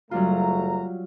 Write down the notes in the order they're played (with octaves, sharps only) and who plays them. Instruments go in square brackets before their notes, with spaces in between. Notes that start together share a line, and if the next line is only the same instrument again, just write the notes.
[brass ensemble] F#1 A3 A#5 [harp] F#3 G3 F4